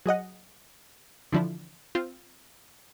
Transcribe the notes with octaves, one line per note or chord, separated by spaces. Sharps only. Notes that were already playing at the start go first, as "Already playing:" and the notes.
F#3 G#4 D#5 F#5
D3 E3 F3 D4 E4
C4 F4